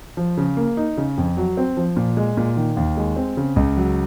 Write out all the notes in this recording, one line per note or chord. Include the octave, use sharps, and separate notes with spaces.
F3
C#3
A#3
D#4
C#3
F2
F#3
C4
F3
A#2
G#3
A#2
D#3
D#2
G#3
C4
C#3
C#2
F#3